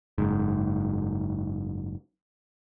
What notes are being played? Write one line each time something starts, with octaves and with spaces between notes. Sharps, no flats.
F#1 G#2